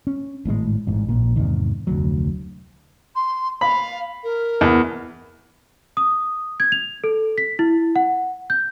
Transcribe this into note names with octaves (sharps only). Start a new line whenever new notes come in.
C#4
G#1 A2 C#3 G#3
A1 G#2
A#1 A#2
E2 G#2 C3 D#3
F1 D2 F#3
C6
F5 B5
A#4
E2
D#6
G#6
F7
A4
B6
E4
F#5
G6